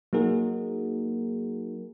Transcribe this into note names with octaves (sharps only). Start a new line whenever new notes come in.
F#3 A#3 D#4 F#4 G#4 A#4